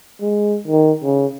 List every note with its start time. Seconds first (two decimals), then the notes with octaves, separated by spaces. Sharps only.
0.22 G#3
0.67 D#3
1.04 C#3